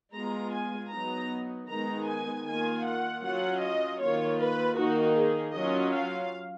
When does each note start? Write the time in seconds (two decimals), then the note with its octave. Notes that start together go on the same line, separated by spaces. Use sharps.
0.14 G#3 B3 F4 A#5
0.53 G#5
0.91 F#3 B3 D#4 A#5
1.68 D#3 G#3 B3 D#4 A#5
2.07 G#5
2.46 D#3 A#3 F4 G#5
2.84 F#5
3.23 F#3 C#4 F4 F#5
3.61 D#5
4.00 D#3 A#3 F4 C#5
4.39 B4
4.76 D#3 A#3 D#4 F#4
5.15 G#4
5.54 F#3 C#4 F4 D#5
5.92 F5